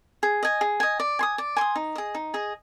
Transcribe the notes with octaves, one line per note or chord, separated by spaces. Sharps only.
G#4
D#5 G#5
G#4
D#5 G#5
D5
G#5 C6 D#6
D5
G#5 C6 D#6
D#4
G#4 D#5
D#4
G#4 D#5